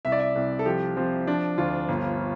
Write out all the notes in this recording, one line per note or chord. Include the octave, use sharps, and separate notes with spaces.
C2 E5
D5
E5
C2
A4
F3 G4
F3 C4
F3 D4
D2 F4
G1